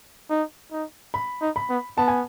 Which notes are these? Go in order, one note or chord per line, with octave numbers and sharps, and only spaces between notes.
D#4
D#4
B5
D#4
B5
B3
B3 A5
G#5